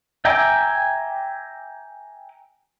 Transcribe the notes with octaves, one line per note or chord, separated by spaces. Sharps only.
E5 G5 G#5 A#5 D6